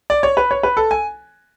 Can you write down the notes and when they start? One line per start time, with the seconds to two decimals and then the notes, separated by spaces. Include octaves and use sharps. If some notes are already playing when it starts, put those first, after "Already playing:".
0.10 D5
0.23 C#5
0.37 B4
0.51 C#5
0.63 B4
0.77 A4
0.91 G#5